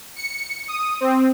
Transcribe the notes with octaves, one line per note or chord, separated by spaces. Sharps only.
C#7
D#6
C4